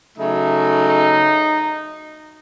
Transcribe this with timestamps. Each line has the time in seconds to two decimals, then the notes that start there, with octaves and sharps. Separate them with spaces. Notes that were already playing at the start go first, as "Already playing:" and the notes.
0.17 C#3 F#3 A3 D#4
0.87 D#4